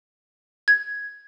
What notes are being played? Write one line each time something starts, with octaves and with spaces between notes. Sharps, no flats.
G#6